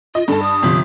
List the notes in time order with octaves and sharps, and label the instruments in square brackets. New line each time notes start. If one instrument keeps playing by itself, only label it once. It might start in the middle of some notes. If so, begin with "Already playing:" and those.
[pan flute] F4 [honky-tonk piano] D#5
[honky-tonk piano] G2 A5 [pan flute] A4
[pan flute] D#6
[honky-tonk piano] G1 C3 F3